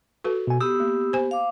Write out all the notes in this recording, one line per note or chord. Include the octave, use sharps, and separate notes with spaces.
F#4 A4 B4
B2 G#5
B3 G4 D#6 E6
A#3
C5 G#5
F5 D6